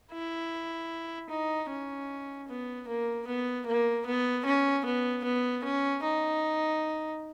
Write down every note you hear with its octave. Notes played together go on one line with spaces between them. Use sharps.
E4
D#4
C#4
B3
A#3
B3
A#3
B3
C#4
B3
B3
C#4
D#4